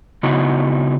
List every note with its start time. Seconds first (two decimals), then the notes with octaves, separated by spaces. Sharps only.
0.23 C#3 B3 D#4 E4 F#4